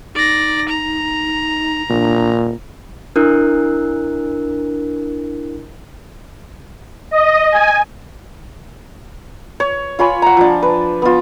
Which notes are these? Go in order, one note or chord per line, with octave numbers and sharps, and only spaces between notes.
D#4 D5 A#6
A#5
A#2 D4
D4 E4 A#4 F#6
D#5
G#5
C#5
F4 C#5 G#5 B5
F#5 A#5
F3 D4
B4
B3 F4